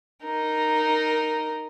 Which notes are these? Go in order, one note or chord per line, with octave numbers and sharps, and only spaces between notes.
D#4 A#4